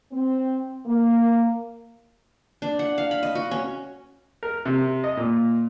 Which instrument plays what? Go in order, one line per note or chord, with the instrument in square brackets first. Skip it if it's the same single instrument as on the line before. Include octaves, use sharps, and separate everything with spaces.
[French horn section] C4
A#3
[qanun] D4
F#5
F5
B5
D#5
F#4
C#4
[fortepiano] A#4
C3
D#5
A#2